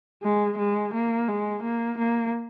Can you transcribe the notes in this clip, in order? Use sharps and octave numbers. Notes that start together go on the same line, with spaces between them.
G#3
G#3
A#3
G#3
A#3
A#3